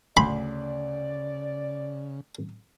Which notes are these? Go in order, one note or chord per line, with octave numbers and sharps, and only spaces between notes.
D2 C#3 D5 B5 C6